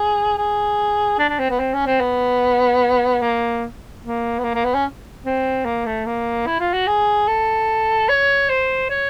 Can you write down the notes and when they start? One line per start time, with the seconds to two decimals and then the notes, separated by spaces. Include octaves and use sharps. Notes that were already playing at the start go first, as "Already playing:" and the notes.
Already playing: G#4
0.38 G#4
1.19 D4
1.29 D4
1.39 C4
1.50 B3
1.59 C4
1.74 C#4
1.87 C4
2.01 B3
3.22 A#3
4.03 A#3
4.39 B3
4.44 A#3
4.54 A#3
4.64 B3
4.74 C#4
5.25 C4
5.65 A#3
5.86 A3
6.06 A#3
6.46 E4
6.60 F4
6.74 F#4
6.87 G#4
7.28 A4
8.09 C#5
8.49 C5
8.90 C#5